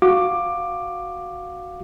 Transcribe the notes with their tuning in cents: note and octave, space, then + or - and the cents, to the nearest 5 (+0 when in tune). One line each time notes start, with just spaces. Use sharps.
F#4 +0 F5 +0 D6 +15